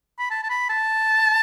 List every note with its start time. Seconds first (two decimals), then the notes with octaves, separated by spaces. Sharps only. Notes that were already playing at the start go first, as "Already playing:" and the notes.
0.19 B5
0.30 A5
0.43 A5
0.49 B5
0.69 A5